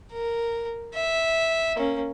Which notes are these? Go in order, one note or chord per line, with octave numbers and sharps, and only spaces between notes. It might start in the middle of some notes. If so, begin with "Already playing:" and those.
A#4
E5
A#3 C#4